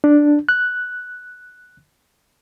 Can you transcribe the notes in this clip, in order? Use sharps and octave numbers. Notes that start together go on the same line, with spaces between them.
D4
F#6